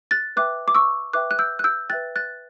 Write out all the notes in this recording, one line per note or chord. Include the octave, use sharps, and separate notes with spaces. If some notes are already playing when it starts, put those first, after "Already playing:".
F#6 A6
B4 E5 G5 D6 F#6
D6
C#6 E6
B4 E5 G5 D6 F#6
F#6
E6 G6
F#6
E6 G6
B4 E5 G5 F#6 A6
F#6 A6